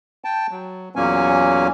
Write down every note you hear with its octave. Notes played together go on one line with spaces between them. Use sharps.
G5 A5
F#3
E2 A#2 F#3 A#3 C#4 G#5